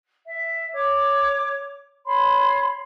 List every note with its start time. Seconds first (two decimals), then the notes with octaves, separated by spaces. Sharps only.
0.24 E5
0.73 C#5 D6
2.05 C#5 B5 C6